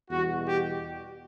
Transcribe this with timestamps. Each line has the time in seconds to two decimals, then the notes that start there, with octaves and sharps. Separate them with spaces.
0.10 E2 B2 G3 F#4
0.46 G4